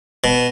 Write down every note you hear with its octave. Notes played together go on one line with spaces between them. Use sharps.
B2